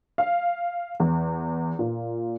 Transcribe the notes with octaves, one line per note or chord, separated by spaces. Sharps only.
F5
E2
A#2